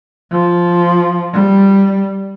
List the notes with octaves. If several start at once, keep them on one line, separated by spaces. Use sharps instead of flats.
F3
G3